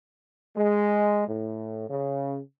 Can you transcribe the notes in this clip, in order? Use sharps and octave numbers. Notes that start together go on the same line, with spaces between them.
G#3
A2
C#3